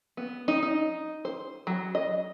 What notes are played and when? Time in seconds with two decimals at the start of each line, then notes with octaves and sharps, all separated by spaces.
0.17 B3
0.48 D#4
0.63 D#4
1.25 C5
1.67 F#3
1.95 D#5